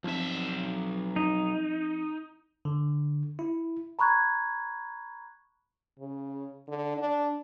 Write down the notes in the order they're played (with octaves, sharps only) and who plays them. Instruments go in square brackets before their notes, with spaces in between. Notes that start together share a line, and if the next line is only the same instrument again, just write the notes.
[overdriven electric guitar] B1 E5 [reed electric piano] F3 C4
[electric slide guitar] D#4
[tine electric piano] D3
E4
[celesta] A#5 B5 C#6 F#6 G#6
[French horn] C#3
D3
D4